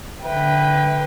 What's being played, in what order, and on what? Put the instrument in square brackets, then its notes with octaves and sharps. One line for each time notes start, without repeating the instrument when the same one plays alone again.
[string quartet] D3 B4 G5 [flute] E5